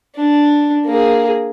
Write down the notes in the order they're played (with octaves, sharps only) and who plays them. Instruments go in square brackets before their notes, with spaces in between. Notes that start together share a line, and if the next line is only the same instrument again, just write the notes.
[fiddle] D4
A#3 G#4